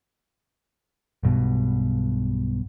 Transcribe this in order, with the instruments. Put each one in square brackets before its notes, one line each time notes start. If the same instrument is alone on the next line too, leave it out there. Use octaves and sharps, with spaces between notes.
[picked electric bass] B1 G2 B2